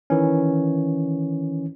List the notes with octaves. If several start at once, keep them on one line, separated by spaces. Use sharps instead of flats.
D#3 E3 C#4